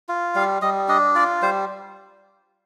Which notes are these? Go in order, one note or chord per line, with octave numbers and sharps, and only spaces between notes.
F4
G3 F5
G3 D#5
D4 D#5
F4 D5
G3 C5